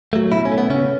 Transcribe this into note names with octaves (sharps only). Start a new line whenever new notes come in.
F#3 A3
B2 E4
C#4
A3
B3
C#3 C#4